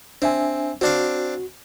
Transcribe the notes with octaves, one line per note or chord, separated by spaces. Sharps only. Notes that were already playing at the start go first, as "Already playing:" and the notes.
C4 D4 E5 G#5
C4 D4 F#4 F5